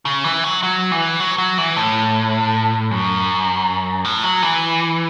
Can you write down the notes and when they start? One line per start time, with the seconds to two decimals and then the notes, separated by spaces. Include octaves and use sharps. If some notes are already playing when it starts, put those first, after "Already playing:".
0.05 C#3
0.24 E3
0.44 F#3
0.63 F#3
0.92 E3
1.20 F#3
1.38 F#3
1.58 E3
1.77 A2
2.91 F#2
4.05 A2
4.24 F#3
4.42 E3